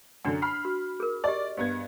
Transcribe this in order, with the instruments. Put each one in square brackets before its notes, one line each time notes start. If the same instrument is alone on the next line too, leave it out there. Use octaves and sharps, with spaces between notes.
[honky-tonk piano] F#2 D3 [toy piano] D4 F#5
[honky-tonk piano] B5 F6 C7
[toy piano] F#4
G#4 A#4
[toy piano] G4 D#5 [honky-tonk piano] D5
[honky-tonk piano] G2 B3 G#6